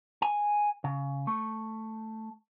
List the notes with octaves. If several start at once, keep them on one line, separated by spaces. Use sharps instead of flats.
G#5
C#3
A3